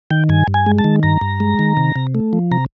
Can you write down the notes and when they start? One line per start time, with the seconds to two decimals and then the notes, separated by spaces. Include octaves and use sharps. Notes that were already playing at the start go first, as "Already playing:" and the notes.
0.10 D#3 G5
0.29 G2 G#5
0.48 G2
0.54 G#5
0.66 G#3
0.79 A5
0.84 D#3
1.03 G2 A#5
1.21 G2
1.40 G#3
1.59 D#3
1.77 C3
1.96 C3
2.15 A3
2.33 F3
2.51 C3 A#5